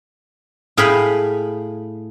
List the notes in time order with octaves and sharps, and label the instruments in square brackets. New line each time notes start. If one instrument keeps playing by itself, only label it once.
[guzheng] A2 G#4 F5 G5 G#5 B5